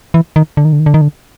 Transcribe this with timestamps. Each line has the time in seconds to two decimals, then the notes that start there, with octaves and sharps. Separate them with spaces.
0.14 E3
0.36 D#3
0.57 D3
0.65 D#3
0.73 D3
0.80 D#3
0.86 D3
0.94 D#3
1.01 D3